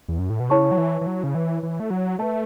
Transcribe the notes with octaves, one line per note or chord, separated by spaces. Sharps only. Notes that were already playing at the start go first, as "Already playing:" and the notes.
E2
F#2
A2
B2
C#3 E4 C#5 A5 C#6
F#3
E3
E3
F#3
C#3
E3
E3
A3
F#3
A3 B4 E5 A5